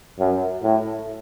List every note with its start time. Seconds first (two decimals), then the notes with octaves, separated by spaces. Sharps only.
0.19 F#2
0.63 A2